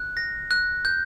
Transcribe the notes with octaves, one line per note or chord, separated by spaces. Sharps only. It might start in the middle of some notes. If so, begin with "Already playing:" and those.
Already playing: F#6
A#6
F#6
G6